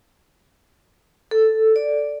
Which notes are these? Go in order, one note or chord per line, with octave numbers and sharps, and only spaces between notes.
A4
D5